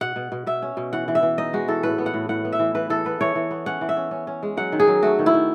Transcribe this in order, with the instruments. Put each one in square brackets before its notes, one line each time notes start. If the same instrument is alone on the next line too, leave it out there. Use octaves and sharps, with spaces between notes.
[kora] B2 F#5
B2
B2
B2 E5
C#4
B2
E3 F#5
E3
E5
E3
D#4 D#5
G#3 F#4
E3 A4
A2 B4
B3
F#5
A2
A2 F#5
B3
E5
E3
E3 B4
E3 A4
B3 B4
E3 C#5
E3
B3
C#4 F#5
E3
E5
C#4
C#4
C#4
G#3
F#3 F#5
D#3
G#4
F#3
A3 F#4
D#3
E4
D#3